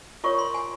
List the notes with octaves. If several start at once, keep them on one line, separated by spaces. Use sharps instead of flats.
F4 A#4 C#5 C#6
C6
G#5